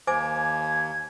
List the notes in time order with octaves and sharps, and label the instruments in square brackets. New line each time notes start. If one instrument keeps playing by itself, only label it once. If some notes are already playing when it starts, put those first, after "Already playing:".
[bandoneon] D#2 [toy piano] C5 G#5 D6 [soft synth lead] G#6